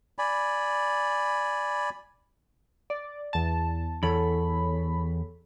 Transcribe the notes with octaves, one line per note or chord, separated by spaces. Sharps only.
D5 G#5 B5
D5
E2 A5
E2 A4 C#5 B5